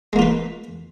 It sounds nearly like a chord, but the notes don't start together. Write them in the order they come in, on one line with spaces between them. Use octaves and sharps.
G#3 A#3 F4 B4